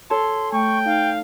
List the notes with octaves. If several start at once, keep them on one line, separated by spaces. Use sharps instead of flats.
A4 C#5 A5 C6
A3 G5 C#6
D#4 F5